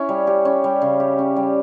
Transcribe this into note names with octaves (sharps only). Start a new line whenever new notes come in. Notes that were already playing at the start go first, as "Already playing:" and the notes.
Already playing: C#4 E4
G3
G4
C#4
G3
C#3
G4
C#4
G3